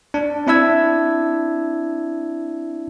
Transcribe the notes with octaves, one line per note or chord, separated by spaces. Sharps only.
D4
C4 D4 E4 E5 E6 G#6